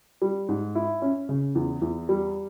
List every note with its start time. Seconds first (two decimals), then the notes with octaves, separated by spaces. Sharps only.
0.22 G3
0.49 G#2
0.75 E4
1.02 C#4
1.29 C#3
1.55 E2
1.82 E2
2.09 G3